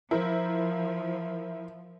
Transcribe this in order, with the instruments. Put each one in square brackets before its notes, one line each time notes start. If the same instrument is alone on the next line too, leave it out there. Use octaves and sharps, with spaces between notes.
[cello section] F3 [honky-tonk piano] E4 A#4 C5